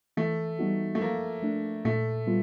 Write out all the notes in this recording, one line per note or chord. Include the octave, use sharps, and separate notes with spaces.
E3 A3
G3 B3 D#4 F#4
A3
F3 A#3
A3 D4
A#2 A3
G3 B3 F4